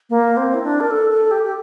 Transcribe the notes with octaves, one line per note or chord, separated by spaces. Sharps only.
A#3
C4
E4
D4
A#4
A4
A4
G4
G4